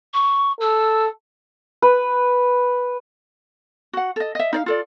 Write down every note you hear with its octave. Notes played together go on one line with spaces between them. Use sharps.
C#6
A4 E6
B4
F#4 F#5
A4 D#5
D#5 E5
D#4 D5 F5
F4 A4 D5